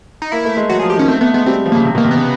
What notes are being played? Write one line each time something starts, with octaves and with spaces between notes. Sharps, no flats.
D#4
A#3 E4
A3
G#3
F#3 F#4
G#4
F3
G4
D#3 C#4
A3 C4
A3 B3
G#3 B3
G3 C4
F3
C#3 A#3
C3
B2 A#3
C3
C#3 B3